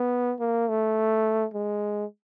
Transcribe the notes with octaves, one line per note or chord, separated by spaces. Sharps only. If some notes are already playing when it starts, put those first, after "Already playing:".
Already playing: B3
A#3
A3
G#3